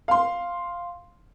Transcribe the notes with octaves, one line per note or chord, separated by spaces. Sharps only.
F5 C6